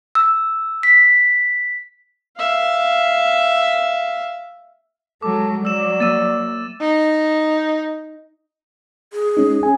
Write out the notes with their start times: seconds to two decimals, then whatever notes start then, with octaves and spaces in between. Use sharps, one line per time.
0.15 E6
0.83 B6
2.36 E5 F5
5.22 F#3 G#3 A4 D6
5.65 F#3 D5 E6 E7
6.00 A#3 E6 A6 D#7
6.81 D#4
9.13 G#4
9.37 G#3 C#4 D#4
9.63 C#4 G#5